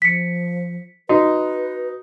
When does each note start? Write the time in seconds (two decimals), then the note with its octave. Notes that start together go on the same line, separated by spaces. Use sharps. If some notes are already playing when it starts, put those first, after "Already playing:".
0.02 F3 B6 C#7
1.09 D#4 F#4 B4